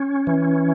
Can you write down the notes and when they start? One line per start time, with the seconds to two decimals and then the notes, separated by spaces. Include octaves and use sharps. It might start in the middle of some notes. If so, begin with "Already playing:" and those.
Already playing: C#4
0.27 E3